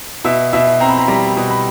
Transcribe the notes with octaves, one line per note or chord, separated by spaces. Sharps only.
B2 E5
B2 E5
C4 A#5
B5
A#5
G3 A#5
B2
B5